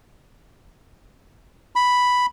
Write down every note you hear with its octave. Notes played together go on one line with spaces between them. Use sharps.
B5